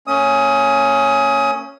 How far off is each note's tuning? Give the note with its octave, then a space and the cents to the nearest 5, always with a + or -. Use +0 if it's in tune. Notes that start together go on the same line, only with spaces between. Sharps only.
A#3 -45 C#4 +0 D#6 +25